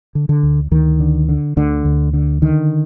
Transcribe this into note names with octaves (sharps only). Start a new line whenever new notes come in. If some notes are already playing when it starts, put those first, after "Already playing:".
D3
D3
D2
D2 D#3
D3
D3
D2 D3
D2
D3
D3 D#3